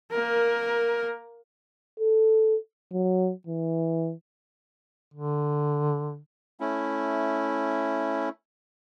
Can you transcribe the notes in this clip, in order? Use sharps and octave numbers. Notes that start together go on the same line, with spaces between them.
A#3 A#4
A4
F#3
E3
D3
A3 C#4 E4